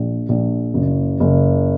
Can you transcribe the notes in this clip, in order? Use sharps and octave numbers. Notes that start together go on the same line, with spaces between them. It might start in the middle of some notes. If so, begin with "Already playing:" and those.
Already playing: A#1
A#1
F#1
F#1